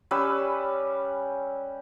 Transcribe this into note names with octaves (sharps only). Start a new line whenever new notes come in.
G3 C#4 B4 E6